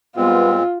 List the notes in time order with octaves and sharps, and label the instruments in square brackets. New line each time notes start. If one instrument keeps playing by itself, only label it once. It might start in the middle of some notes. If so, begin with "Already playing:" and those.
[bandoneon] A#2 G#3 C4 [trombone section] G3 B3 [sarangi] F4